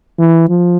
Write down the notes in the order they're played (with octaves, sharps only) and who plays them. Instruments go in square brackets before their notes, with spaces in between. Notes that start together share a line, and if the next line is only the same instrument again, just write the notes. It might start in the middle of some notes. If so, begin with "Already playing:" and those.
[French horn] E3
F3